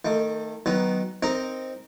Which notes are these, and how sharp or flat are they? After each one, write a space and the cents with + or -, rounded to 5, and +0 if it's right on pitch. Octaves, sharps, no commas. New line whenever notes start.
D#3 +0 A3 +25
D#3 +0 F#3 +25 B3 +0
C4 +0 D#4 +0 A#4 +0